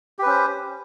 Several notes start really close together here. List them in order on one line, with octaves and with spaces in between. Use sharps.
G4 B4 C#4 C5